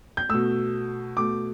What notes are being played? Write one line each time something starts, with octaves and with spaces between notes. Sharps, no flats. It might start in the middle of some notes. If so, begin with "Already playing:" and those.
G6
B2 A3 E6
B2 A3 D6